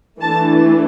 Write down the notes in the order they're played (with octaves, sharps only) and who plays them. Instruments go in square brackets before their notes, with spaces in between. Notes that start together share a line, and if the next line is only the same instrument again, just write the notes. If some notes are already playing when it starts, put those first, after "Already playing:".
[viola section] E3 A3 D4 A5